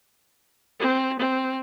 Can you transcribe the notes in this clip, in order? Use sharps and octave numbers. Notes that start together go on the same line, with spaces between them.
C4
C4